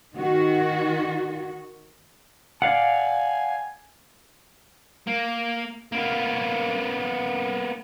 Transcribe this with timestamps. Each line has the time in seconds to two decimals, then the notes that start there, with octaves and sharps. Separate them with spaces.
0.17 D#3 F#4
2.62 D5 F5 F#5 G#5
5.07 A#3
5.92 A#3 B3